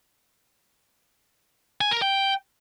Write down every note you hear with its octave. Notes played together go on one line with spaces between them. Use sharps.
G#5
A#4
G5